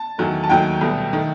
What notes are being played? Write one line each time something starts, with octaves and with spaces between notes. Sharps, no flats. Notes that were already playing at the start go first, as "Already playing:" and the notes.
Already playing: A5
E2 D#3 F#3 A3
A5
D#2 D#3 F#3 A3 G5
C2 B2 A3
D#3 A3